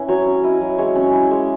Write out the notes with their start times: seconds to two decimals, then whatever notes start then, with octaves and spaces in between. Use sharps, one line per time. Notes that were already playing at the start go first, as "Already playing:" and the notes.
Already playing: C#4 E4 B4
0.08 F#3 C#5
0.26 C#4
0.43 E4 D#5
0.61 F#3
0.78 G#3 C#5
0.96 C#4
1.13 E4
1.31 G#3